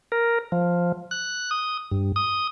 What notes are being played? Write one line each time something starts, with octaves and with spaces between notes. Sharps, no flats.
A#4
F3
F#6
D#6
G2
D#6